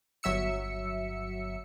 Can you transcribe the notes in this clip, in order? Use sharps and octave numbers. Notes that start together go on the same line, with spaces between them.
G1 F#3 E5 E6 C#7